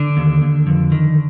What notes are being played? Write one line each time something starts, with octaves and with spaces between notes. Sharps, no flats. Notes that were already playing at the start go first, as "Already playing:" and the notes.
Already playing: D3 D4
D#2
D#2
F2
D#3